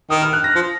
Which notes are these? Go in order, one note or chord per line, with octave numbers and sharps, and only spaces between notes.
D#3 D#6
F6
F#6
A#6
F3